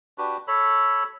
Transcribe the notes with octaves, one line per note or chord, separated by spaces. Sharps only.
D4 F#4 G4 B4
A4 C#5 B5